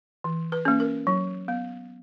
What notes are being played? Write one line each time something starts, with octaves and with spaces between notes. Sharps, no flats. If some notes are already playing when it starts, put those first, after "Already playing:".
E3
B4
A#3 C#4
A#4
F#3
B3